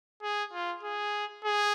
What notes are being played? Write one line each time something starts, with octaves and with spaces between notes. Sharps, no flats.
G#4
F4
G#4
G#4